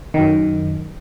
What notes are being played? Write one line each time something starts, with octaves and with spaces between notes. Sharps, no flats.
F#2 D#3